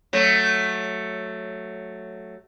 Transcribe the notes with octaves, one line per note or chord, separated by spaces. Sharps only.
F#3 A3